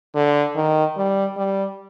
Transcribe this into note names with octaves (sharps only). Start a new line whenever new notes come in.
D3
D#3
G3
G3